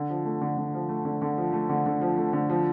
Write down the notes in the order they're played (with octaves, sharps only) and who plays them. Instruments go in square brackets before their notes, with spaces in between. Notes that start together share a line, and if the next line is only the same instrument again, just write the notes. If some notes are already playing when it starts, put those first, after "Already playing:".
Already playing: [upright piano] D3
F3
A3
D3
D3
F3
A3
D3
D3
F3
A3
D3
D3
F3
A3
D3
F3